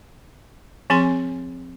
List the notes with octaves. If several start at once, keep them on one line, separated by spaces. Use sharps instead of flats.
F3 C4 G#4 G#5 C6